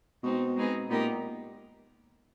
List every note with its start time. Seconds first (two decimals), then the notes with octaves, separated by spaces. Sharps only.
0.23 B2 G#3 C4 D#4
0.56 G#3 C4 D#4 G#4 B4
0.89 A#2 G#3 B3 D#4 G4 A#4